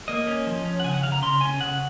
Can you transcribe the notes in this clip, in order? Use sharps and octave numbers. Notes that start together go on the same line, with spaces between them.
A#3 D#5
C#4
F3
C#4
F#5
C#3 G#5
F#5
C#3 F5
A#5
C#3 C6
C#4 G#5
C#3 F#5